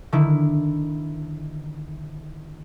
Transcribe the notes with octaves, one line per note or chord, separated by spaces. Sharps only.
D3 D#3 E4